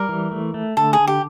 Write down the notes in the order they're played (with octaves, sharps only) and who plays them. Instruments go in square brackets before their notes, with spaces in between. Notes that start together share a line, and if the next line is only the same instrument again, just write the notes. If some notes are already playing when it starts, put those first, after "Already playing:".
Already playing: [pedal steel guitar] G3 [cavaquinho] A#4
[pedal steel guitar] E3
A3
A3
[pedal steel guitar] D3 [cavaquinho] A4
[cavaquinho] G#4
[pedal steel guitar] D3
[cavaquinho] G4